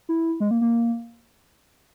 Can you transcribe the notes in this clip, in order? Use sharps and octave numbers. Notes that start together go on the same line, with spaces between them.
E4
G#3
A#3
A#3